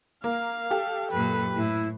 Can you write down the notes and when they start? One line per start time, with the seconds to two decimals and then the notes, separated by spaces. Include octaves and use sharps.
0.24 A#3 F5
0.71 G4 A4
1.12 F#2 A#2 B4
1.56 A2 E4